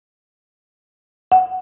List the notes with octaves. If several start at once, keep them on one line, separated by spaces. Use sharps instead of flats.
F#5